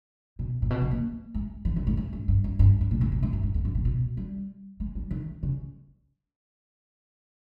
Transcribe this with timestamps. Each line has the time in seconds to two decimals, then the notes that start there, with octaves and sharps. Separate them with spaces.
0.39 B2
0.62 A#2
0.70 B2
0.81 C#3
0.91 A#3
1.34 G#3
1.65 E3
1.76 D#3
1.87 G#2
1.97 G#2
2.13 G2
2.28 G2
2.44 G2
2.59 G2
2.81 G2
2.91 A#2
3.01 G#2
3.12 B2
3.22 G#2
3.33 G2
3.43 G#2
3.54 E2
3.65 G2
3.75 A#2
3.85 B2
4.17 G3
4.80 G#3
4.95 G3
5.11 D#3
5.43 C#3